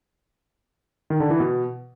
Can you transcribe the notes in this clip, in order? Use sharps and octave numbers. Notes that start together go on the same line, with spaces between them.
D#3
D3
E3
B2